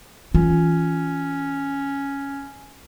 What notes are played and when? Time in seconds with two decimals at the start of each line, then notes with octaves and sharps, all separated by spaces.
0.35 E3 C#4 F4